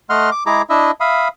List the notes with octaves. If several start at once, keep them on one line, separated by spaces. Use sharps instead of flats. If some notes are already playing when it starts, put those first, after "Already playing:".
A3 D#5 F#5 C6 F6
D6
G#3 E4 G#4 A#5 D6
D4 E4 D#5 E5
E5 F5 B5 D#6